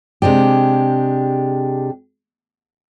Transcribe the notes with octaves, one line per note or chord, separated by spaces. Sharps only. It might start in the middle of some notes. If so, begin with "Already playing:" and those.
C3 G#3 D4 G4